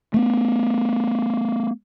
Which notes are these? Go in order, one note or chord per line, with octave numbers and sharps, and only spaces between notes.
A3 B3